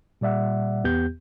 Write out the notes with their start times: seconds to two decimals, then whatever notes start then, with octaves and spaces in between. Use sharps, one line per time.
0.21 A#2 G3 D5 E5 F#5
0.84 E2 B3 G4 G6